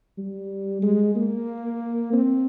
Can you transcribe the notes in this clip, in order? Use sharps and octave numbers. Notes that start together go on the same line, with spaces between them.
G3
G#3
A#3
C4